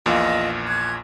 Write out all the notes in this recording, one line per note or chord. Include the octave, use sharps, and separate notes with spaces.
A#1 E2 A#2 F4 D#5
F#6 G#6